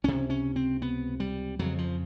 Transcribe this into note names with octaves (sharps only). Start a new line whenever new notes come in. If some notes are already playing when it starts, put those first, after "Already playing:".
C#2 C3 C#4
C#4
C4
B3
G3
F2 C#3 F#3
F3